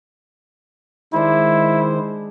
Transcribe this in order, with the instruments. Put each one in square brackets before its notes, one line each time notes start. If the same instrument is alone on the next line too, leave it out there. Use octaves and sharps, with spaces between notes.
[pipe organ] D#3 C5 [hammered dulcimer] G#3 D4 [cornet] E4